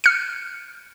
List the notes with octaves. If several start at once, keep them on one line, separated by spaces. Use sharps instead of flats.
F6 C#7